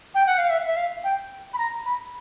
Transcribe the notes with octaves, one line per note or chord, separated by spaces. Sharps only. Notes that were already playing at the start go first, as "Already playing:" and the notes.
G5
F#5
F5
E5
E5
F5
G5
B5
A#5
B5